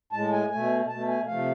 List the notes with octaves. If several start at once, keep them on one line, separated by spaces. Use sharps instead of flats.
A2 G#3 A5
G#5
B2 A3 G#5
B2 A3 A5
G#5
C3 F3 A3 F5